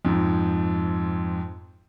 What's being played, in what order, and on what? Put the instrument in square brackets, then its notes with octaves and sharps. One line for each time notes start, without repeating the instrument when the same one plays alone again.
[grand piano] F2 G#2